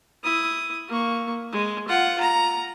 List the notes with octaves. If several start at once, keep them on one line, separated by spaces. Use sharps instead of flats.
E4 D#6
A#3 C#6
G#3
F4 F#5
A#5